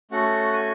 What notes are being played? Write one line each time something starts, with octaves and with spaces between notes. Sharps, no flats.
A3 C#4 F#4 A4 F#5
G#5